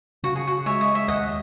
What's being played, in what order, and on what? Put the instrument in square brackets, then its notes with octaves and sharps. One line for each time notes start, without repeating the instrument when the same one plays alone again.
[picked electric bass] C#3 [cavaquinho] F#4
[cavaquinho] G#4
F#4
[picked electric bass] G#3 [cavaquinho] C#5 E5
[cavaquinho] D#5
E5
[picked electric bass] D#2 [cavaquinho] D#5 F#5